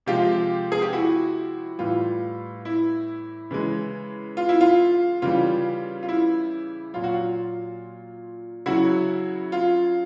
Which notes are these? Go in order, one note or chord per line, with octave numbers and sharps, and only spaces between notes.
C3 F3 G#3 F4 G4
G#4
G4
E4 F#4
A2 E3 G3 F4
E4
C#3 E3 G#3
F4
E4
F4
C#3 E3 G3 F4
F4
E4
A#2 F#3 F4
F#4
F4
C#3 F#3 E4 F#4
F4